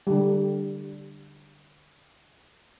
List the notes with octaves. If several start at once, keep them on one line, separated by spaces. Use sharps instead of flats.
D3 G3